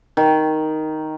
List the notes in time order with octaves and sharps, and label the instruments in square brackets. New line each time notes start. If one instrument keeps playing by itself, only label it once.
[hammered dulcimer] D#3